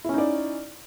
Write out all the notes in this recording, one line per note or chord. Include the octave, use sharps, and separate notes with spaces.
C#4 D#4 E4 D5